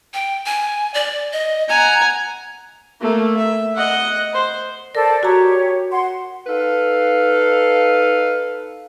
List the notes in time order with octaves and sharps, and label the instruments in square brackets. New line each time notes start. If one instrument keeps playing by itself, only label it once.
[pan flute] G5
G#5
D5
D#5
[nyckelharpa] F#5 G#5 [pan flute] A#5
[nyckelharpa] A3 A#3
E5
D#5 F#5
C5
[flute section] A4 C5 D5 [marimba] A#4
[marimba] F#4 A#5 [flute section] G4 C#5
[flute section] F#5 C6
[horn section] D#4 A4 B4 F5